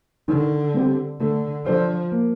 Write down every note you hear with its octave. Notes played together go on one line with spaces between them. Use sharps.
D3 D#3
G3 C4 G4
D3 A3
F3 D4 A4 C5
A#3